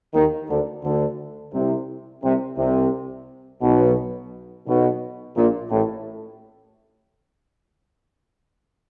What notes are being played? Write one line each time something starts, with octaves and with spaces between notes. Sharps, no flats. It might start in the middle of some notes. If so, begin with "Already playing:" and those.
D#2 D#3
D2 D3
D2 D3
C2 C3
C2 C3
C2 C3
B1 B2
B1 B2
A#1 A#2
A1 A2